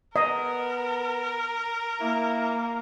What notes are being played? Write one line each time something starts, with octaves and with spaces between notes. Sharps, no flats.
B3 A#4 D#5
A#3 E4